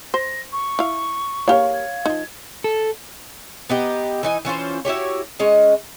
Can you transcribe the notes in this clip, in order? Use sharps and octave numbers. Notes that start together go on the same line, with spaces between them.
C5 A#6
C#6
E4 F5
A#3 G4 A#4 C#5 F5
G#6
F3 D#4
A4
B3 D#4 G4
E3 D#4 G#5
E3 C#4 F4 C5
E4 F#4 G4 C#5
G#3 C#4 D#5